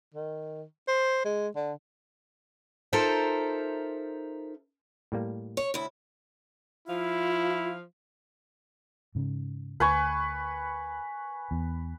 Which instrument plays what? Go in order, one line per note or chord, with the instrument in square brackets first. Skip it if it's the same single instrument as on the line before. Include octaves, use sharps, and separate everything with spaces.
[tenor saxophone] D#3
C5
G#3
D3
[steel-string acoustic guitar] D#4 F4 A4 A#4 C5 E5
[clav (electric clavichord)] A2 G3 A#3
[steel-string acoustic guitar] C#5
D2 E4
[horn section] F3 F5 [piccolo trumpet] E4 [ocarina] F4
[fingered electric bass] G#2 C#3
[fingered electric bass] D2 [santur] B4 G#5 C#6
[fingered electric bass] E2